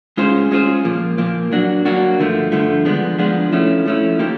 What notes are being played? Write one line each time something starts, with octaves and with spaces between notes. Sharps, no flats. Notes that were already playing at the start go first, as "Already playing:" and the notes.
G#3 C#4 F4 G#4 C5
G#3 C#4 F4 G#4 C5
A#2 F3 A#3
A#2 F3 A#3
F#3 A#3 D4 F#4
F#3 A#3 D4 F#4
G2 D3 F3 A3
G2 D3 F3 A3
F3 G#3 B3 D4
F3 G#3 B3 D4
F3 A3 C#4 E4
F3 A3 C#4 E4
F3 A#3 D#4 G4